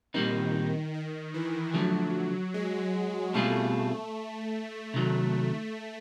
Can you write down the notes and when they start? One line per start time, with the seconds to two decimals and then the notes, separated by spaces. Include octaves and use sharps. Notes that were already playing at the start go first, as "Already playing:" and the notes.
0.14 A#2 D#3 G3 C4 D#4
0.94 D#3
1.34 E3
1.74 D3 F3 F#3 A3
2.54 G#3
3.34 B2 G3 A3 C4 F4 G#4
4.94 C3 D#3 F#3